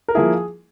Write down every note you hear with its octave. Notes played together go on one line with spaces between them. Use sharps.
A#4
F3 A#3 E4 G#4